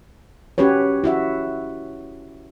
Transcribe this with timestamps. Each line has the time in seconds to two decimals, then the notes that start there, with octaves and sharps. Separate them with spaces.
0.58 C#4 F#4 G4 B4 C#5
1.04 E4 F#4 E5